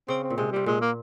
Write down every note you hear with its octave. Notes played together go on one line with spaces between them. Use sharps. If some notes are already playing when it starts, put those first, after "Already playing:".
C#3 C4
C4
A#2
C3 G#3
C3 G3
A#2 G#3
A#3